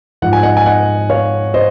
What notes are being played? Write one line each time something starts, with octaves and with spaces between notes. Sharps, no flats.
G#2 F3 F#5
G#5
D#5 F#5
G#5
D#5 F#5
C#5 F5
C5 D#5